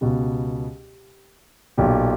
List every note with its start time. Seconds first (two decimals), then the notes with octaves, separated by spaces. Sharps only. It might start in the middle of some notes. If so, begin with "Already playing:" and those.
0.01 C#2 B2 G4
1.78 B1 A#2 G4